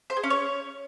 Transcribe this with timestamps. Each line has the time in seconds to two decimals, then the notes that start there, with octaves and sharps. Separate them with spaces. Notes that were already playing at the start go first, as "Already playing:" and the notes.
0.10 C5
0.17 G#4
0.24 C#4
0.30 C#5